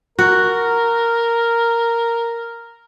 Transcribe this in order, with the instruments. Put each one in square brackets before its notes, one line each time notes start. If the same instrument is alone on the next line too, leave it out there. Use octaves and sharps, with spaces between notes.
[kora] F#4 [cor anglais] A#4